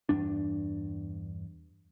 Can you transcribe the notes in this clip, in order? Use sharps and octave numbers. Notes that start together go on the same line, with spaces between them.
E2 G2 D4